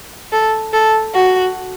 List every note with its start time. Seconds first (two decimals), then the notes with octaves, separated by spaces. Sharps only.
0.32 A4
0.73 A4
1.14 F#4